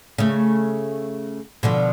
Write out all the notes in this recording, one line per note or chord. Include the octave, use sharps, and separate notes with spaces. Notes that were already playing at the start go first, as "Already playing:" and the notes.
C#3 A3
B2 D3 F3